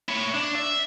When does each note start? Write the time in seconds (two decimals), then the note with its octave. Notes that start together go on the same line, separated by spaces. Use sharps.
0.09 E4 C#5
0.34 D4
0.55 E5